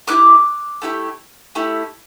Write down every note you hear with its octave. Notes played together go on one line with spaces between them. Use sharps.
A3 E4 G4 D6 F#6
A3 E4 G4
A3 E4 G4